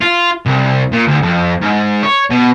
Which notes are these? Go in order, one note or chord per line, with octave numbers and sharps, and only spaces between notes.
F4
C2
A#2
D2
F2
G#2
C#5
B2